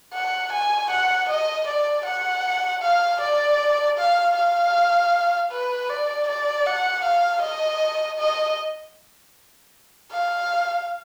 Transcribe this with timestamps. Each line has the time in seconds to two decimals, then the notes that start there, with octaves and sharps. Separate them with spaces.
0.14 F#5
0.53 G#5
0.91 F#5
1.29 D#5
1.68 D5
2.06 F#5
2.83 F5
3.21 D5
3.98 F5
4.37 F5
5.52 B4
5.89 D5
6.28 D5
6.66 F#5
7.04 F5
7.42 D#5
8.19 D#5
10.12 F5